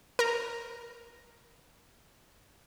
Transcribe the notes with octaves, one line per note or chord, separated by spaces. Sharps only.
A#4 A#5